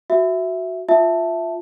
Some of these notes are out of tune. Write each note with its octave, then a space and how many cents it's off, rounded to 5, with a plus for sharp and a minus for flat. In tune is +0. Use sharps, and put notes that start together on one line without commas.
F#4 +0 E5 +0
F4 +0 E5 +0 A5 +0